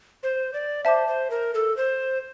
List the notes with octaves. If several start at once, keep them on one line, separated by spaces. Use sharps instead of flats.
C5
D5
C5 E5 A5 D6
C5
A#4
A4
C5